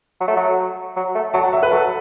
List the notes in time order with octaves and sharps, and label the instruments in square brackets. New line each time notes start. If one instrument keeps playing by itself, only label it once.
[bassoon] F#3
A3
F#3
F#3
A3
[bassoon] F#3 [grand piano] A5
[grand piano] F#5
[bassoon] F#3 [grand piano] E5
[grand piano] B4
[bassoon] F#3 [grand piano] A4